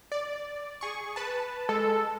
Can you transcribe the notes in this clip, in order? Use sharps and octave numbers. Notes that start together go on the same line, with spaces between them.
D5
G#4 C#6
B4 A5
G#3 A4